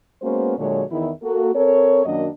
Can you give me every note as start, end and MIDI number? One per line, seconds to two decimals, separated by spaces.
0.22 0.56 56
0.22 0.56 58
0.22 0.56 59
0.22 0.56 61
0.22 0.56 66
0.22 0.56 72
0.58 0.83 46
0.58 0.83 50
0.58 0.83 54
0.58 0.83 56
0.58 0.83 73
0.90 1.10 40
0.90 1.10 51
0.90 1.10 64
1.23 1.50 58
1.23 1.50 66
1.23 1.50 69
1.54 2.04 60
1.54 2.04 69
1.54 2.04 70
1.54 2.04 73
2.05 2.27 42
2.05 2.27 51
2.05 2.27 58
2.05 2.27 62
2.05 2.27 66
2.05 2.27 75